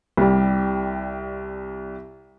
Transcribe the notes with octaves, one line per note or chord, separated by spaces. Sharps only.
C2 G3